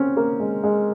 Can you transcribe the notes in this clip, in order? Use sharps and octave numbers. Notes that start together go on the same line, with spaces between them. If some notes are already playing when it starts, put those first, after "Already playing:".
Already playing: C4 C#4
A#3
G#3
G#3